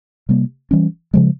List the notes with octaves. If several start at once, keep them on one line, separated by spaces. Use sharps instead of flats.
C3 G3 A#3
E3 G3 C#4
C#3 F3 G#3